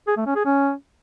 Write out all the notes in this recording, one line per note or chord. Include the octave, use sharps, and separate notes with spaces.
G#4
A3
C#4
G#4
C#4